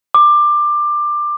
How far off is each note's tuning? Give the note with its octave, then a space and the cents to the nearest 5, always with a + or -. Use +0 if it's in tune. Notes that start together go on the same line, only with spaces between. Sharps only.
D6 +20